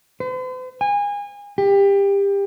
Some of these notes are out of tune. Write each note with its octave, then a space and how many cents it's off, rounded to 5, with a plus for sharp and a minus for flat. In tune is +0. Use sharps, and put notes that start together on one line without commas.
C5 -45
G#5 -30
G4 +25